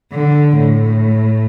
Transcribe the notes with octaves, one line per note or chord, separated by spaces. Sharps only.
D3
A2